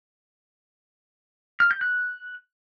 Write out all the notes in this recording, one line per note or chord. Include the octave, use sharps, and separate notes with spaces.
F6
G6
F#6